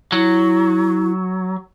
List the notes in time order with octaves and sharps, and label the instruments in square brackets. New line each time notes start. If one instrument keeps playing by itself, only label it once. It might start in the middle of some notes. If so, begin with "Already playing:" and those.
[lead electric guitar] F#3 [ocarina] E4